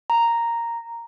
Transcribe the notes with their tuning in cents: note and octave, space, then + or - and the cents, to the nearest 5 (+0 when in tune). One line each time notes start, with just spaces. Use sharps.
A#5 -5